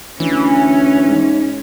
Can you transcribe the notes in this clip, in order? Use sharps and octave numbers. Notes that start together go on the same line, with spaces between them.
D2 E3 C#4
G#2